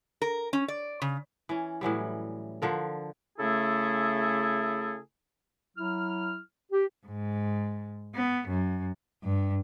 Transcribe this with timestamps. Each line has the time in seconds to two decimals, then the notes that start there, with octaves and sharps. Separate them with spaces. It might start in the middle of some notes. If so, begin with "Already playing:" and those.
0.22 A#4
0.53 C#4
0.68 D5
1.02 C#3
1.49 E3 C#4
1.81 A2 E3 F#3 G3
2.62 D3 F3 A#4
3.38 C#3 A3 E4 G#4 A4
5.77 F#3 E4 F6
6.72 G4
7.07 G#2
8.15 B3
8.48 F#2
9.23 G2